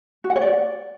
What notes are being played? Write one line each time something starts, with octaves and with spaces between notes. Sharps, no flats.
F#4
F#5
C#5
D5